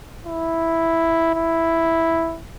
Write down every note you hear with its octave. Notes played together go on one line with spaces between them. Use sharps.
E4
E4